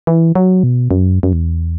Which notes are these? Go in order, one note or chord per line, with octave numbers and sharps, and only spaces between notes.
E3
F#3
B2
F#2
F#2
E2